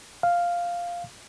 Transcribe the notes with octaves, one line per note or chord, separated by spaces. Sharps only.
F5